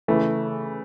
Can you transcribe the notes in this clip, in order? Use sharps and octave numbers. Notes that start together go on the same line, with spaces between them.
C#3 E3 A3